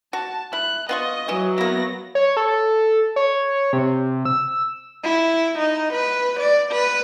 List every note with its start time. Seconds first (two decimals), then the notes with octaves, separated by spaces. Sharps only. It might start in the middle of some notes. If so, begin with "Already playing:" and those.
0.13 F#4 A5
0.53 E4 F#6
0.89 B3 F4 D#5 C#6
1.28 E3 F#3 C#5
1.58 A#3 B3 E4 A#6
2.15 C#5
2.37 A4
3.16 C#5
3.73 C3
4.25 E6
5.04 E4
5.58 D#4
5.93 B4
6.40 D5
6.72 B4